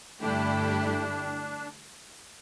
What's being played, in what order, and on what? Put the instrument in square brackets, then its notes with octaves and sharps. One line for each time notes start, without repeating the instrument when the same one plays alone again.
[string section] G2 D3 A3 E4 G4 [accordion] D4